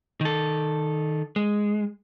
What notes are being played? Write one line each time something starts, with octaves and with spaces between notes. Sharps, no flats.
D#3 A4
G#3